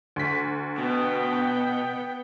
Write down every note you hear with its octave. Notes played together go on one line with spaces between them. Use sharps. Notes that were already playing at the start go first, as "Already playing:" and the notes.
D2 B6
B2 B3 G5